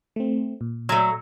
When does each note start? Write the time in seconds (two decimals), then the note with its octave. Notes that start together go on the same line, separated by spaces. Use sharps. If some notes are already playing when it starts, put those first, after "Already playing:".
0.16 A3 C4
0.61 A#2
0.89 F#3 A3